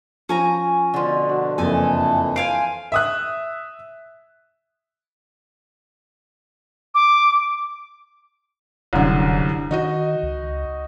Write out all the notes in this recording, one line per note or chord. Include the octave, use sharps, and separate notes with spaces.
F3 C#4 G#5 A#5
B2 D3 F3
F#4
F#1 F2 E3 A4 G#5
C5 F5 G#5 D7
E5 D#6 F#6
D6
E1 C2 F#2 D3
D#3 D#4 F#4 D#5
C#2